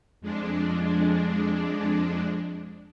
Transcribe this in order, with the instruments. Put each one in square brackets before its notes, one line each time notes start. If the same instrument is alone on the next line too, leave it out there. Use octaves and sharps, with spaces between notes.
[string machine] F2 G#3 D4